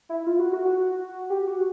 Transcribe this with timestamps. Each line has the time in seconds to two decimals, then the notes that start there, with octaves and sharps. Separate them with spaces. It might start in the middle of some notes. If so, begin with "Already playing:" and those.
0.09 E4
0.27 F4
0.39 F#4
0.53 F#4
0.65 F#4
1.30 G4
1.47 F#4